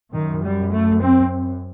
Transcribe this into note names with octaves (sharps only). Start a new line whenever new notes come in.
F#2 D#3
G3
A3
C4